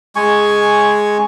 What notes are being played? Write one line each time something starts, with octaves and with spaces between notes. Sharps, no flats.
G#3 G#5 C#6